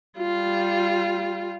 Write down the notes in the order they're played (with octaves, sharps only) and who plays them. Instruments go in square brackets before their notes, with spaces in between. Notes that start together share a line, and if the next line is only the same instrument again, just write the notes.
[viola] G3 F4